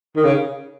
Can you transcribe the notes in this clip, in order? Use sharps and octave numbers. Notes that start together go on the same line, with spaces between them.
D#3
C#3